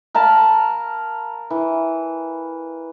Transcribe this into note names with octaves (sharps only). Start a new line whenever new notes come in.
A#4 F5 A5 B5
E3